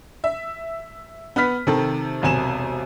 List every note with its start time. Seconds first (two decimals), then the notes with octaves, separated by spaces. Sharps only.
0.24 E5
1.36 B3 B4 F6 B6
1.67 C3 D#3 A4
2.22 E1 B1 C3 G#5 E7